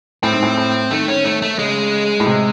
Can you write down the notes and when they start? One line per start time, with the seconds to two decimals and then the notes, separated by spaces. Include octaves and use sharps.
0.23 A2 C4
0.33 G#2
0.43 A2
0.57 A2
0.91 D#3 A3
1.08 C#4
1.25 A3
1.42 A3
1.58 C#3 G#3
2.20 A2
2.26 C3